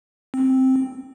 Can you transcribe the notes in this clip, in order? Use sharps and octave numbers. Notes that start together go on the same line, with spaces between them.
C4